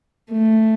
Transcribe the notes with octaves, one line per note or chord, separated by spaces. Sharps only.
A3